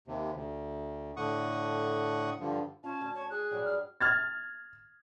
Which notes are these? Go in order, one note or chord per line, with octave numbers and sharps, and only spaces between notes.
D#2 C3
D2
A2 D3 F#5 C#6 D#6
G2 D3 F3
C#4 F4 A5
D2
C#5
G#4 F#6
G2 F#3 G3
F6
F6 G#6 A6